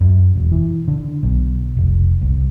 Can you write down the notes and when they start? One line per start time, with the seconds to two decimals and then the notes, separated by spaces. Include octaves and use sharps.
0.01 F#2
0.35 E1
0.52 E3
0.88 D3
1.23 B1
1.77 F1
2.22 C2